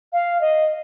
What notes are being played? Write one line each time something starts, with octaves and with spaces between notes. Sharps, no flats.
F5
D#5